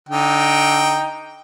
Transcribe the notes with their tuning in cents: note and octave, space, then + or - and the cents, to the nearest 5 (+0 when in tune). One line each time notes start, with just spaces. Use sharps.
D3 -20 D#4 +0 G5 +0